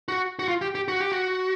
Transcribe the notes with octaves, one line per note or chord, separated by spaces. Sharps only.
F#4
F#4
F4
G4
G4
F#4
G4
F#4